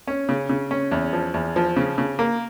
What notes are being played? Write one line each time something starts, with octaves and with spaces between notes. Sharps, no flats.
C#4
C#3
C#3
C#4
E2
F3
E2
F3
C#3
C#3
A#3